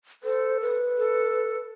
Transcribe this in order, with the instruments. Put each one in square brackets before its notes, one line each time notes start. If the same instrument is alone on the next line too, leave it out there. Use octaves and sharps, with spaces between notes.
[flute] A4 [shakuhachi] C5
[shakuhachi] B4
[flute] A4